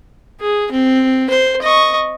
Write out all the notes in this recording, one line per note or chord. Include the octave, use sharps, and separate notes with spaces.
G#4
C4
C5
D#5 C#6